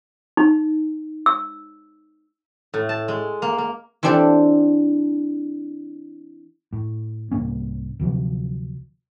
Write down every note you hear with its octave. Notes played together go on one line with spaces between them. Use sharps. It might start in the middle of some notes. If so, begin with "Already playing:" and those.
D#4
E6
A2
A5
G#3
A#3
A#3
E3 C4 D4 G4 A4 D5
A2
C2 G#2 A#3 C#4
D2 C3 F3 F#3